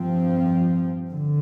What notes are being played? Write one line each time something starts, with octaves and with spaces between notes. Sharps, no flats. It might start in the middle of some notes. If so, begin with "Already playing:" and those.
Already playing: G2 F3 C4
D3